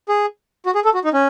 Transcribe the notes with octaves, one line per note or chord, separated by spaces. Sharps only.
G#4
F#4
G#4
A4
F#4
D#4
C#4